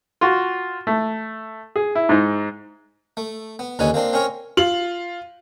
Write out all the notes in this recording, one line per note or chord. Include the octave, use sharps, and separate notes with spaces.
F4 F#4
A3
G#4
E4
G#2 D#4
A3
B3
D#2 D3 C#4 D#4 B4 G#5
A#3 C4 D4 C6
C4 C#4 A#4 C#5
F4 F#7